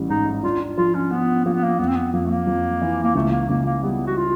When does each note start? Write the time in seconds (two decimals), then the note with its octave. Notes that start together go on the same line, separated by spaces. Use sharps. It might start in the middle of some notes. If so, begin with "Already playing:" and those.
Already playing: A1 G3
0.09 G#2 D#4
0.44 D4 F4
0.77 F3 F4
0.95 C#4
1.11 F3 B3
1.45 F3 A#3
1.54 B3
1.64 A#3
1.79 F2 B3
1.88 C4
1.96 B3
2.13 F2 A#3
2.26 A3
2.30 A#3
2.47 F2
2.81 E3
3.04 A#3
3.15 C#2 A3
3.32 A#3
3.49 C#2 A#3
3.66 A#3
3.83 G3 B3
4.07 F#4
4.17 F4